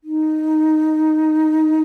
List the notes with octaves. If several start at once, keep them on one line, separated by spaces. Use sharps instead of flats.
D#4